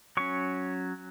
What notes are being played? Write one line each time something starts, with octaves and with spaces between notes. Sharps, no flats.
F#3 C#4 C#6